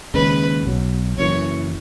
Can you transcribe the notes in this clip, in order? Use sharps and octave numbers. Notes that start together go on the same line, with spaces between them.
D#2 C#3 G#3 C#4 B4
B1 B2 F#3
F#1 F#2 E3 C#5